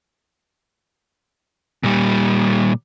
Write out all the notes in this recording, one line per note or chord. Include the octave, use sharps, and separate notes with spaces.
A#2 G3